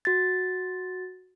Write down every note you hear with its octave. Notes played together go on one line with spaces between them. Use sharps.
F#4 A6